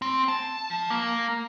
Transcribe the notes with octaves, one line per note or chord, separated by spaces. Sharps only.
C4
A5
F3
A#3